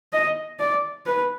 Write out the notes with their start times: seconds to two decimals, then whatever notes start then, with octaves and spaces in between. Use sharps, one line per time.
0.13 D#5
0.60 D5
1.06 B4